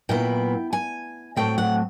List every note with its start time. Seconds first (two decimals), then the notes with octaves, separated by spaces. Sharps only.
0.09 A#2 F#3 B3 E4 G5
0.73 G#5
1.36 A2 F#3 A3 C4 G5
1.58 F#5